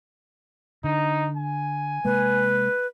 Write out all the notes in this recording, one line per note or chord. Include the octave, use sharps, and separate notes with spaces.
D3 D#4
G#5
C3 G#3 A#3 B4